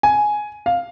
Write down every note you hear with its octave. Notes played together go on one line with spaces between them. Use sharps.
G#5
F5